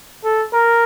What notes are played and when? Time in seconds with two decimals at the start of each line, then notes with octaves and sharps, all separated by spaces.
0.24 A4
0.53 A#4